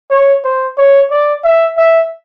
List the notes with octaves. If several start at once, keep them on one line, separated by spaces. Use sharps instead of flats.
C#5
C5
C#5
D5
E5
E5